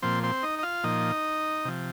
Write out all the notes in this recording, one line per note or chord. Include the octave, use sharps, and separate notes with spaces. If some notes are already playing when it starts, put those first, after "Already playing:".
A#2 F3 C4 C5
C4 C5
D#4 D#5
D#5
F4 F5
A#2 F3 D#4 D#5
C3 F3